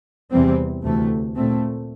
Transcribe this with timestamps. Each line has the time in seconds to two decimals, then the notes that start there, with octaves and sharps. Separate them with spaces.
0.31 E2 C3 E3 G3 C4
0.83 D2 C3 E3 A3
1.35 A#2 A3 C4